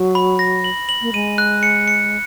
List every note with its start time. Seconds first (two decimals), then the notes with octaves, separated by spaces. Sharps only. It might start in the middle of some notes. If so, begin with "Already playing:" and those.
Already playing: F#3
0.15 B5
0.39 A#6
0.64 F#7
0.89 F#7
1.02 A#3
1.13 G#3 D#7
1.38 F#6
1.63 C#7
1.88 C#7